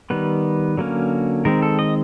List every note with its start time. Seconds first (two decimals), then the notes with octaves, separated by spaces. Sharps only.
0.10 D#3 G3 B3 B4
0.78 D3 F#3 A#3 C#4
1.45 D#3 G#3 C4 A#4
1.62 A4
1.79 D#5